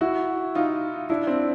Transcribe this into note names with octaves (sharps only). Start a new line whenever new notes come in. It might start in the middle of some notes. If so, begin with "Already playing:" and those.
E4 F#4
D#4 F4
D4 E4
C4 D4